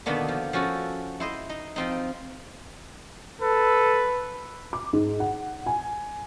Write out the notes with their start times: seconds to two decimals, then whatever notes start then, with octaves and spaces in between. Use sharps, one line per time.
0.06 B2 D3 D#3 A#3 B3 D4
0.28 F3
0.53 F3 C#4 F#4 A4 A#4
1.20 E4 C5 D#5
1.49 D#4 D#5
1.76 F3 C4 D#4
3.42 A4 B4
4.73 D6
4.93 G#2
5.20 F#5
5.66 G#5